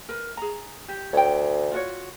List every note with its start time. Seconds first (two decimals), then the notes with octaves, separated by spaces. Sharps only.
0.09 A#4 B4
0.37 G#4 A#5
0.88 G4
1.13 D2 C#5 G5
1.72 F4 F#4 C#5